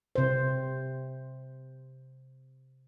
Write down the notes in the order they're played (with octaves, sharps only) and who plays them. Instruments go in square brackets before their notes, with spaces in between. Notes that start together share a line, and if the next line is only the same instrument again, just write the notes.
[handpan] C3 C5